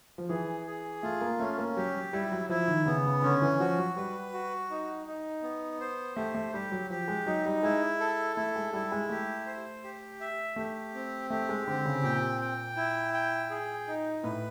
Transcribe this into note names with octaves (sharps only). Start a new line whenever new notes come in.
F3
E3 G#4
G#4
A3 F4
A#3
A3 C#4
A#3
F#3 G4
F#3
G3 E4
F#3
F3 E4
D#3
C#3 B3
C#3
D3 C#4
E3
F3 F#4
F#3
G3 B4
F#4
D#4
D#4
B3
C5
A3 G4
A3
G3 G4
F#3
F3 G4
G#3
F#3 D#4
G3
G#3 E4
A4
A3 E4
G#3
G3 E4
G#3
A3 G4
C5
G4
E5
A3 G4
C4
A3 G4
G#3
D3 C4
C#3
A#2 G5
G5
E4
G5
G#4
D#4
A2 B4